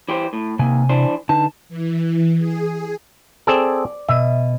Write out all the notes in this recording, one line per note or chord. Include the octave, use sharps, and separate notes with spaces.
E3 G4 C5
A2
D#2 C3 G#5
E3 D4 C5
D3 D#4 B4 A5
E3
G#4
C4 G#4 A4 D5
B2 E5 D#7